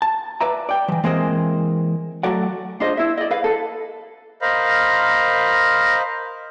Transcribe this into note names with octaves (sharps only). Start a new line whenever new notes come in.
A5
B4 D5 E5 A#5
D5 G5
E3 F3
E3 G#3 A#3 C4 C5 D#5
F#3 A3 F#4 A4 D5 F#5
D4 F4 C5 D#5
E4 E5
D5 D#5
B4 F5
A4 B4
A#4 C5 D#5 F5 B5